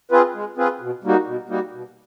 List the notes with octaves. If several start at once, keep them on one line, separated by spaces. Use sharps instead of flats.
C4 F4 G#4 B4
G#3
C4 F4 G#4 B4
B2
G3 A#3 D#4 F#4
B2
G3 A#3 D#4 F#4
B2